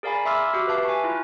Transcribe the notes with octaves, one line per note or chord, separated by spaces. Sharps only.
G#4 A#4 D5 F5 G#5 B5
E5 B5 C6 D6 E6 F6
F#4 G4 D6
B4 E5 F5 A5 D6
G#5 C#6
E4 F4